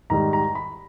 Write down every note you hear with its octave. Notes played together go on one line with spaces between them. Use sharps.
G#2 D#3 G3 A#5
A#5
B5